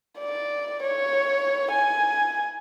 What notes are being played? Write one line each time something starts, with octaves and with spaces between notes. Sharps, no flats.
D5
C#5
G#5